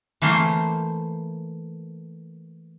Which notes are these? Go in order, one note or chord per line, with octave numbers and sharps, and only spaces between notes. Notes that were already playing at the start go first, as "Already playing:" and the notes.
E3 A3 A#3 C5